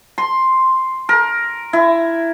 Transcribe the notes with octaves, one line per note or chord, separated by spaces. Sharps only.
C6
A#4
E4